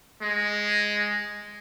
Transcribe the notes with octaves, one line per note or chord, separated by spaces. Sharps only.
G#3